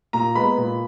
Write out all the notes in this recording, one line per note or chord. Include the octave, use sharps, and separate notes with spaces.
A#2 A#5
G#3 B3 B5
A#2